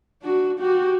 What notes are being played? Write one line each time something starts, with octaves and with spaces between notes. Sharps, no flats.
D4 F#4
F#4 G4